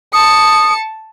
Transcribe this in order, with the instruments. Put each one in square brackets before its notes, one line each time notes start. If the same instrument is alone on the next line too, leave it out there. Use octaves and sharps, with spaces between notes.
[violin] A5 C#7 [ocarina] D#6